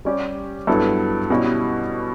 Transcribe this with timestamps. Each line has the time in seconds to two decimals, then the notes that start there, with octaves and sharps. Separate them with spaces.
0.05 G3 C#4 G4 D5
0.67 G2 F#3 B3 E4 A4
1.30 B2 G3 C#4 E4